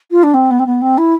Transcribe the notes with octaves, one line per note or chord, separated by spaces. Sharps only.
F4
D4
C4
B3
C4
B3
C4
E4